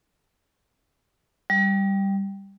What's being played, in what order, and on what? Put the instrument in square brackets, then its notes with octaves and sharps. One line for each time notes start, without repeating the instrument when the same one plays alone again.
[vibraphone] G3